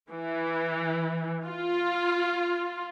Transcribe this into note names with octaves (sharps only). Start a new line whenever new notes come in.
E3
F4